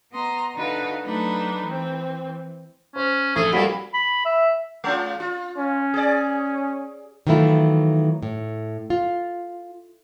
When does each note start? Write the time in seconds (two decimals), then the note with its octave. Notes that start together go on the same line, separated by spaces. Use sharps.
0.11 B3 D#5 A#5 C6
0.55 D3 D#4 F#4 B4 F5 A5
1.02 F#3 A3 D4 D#4 B4
1.63 E3 C4
2.96 C#4 C5
3.36 A#1 A3 G#4
3.52 F2 G3 A#3 E4 F#4
3.94 B5
4.25 E5
4.84 G#3 C#4 F4
5.20 F4
5.57 C#4
5.94 G#4 D5
7.27 D#3 E3 F#3 A3 E4 F4
8.23 A2
8.90 F4